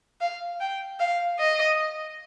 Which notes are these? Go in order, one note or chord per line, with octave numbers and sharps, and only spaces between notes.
F5
G5
F5
D#5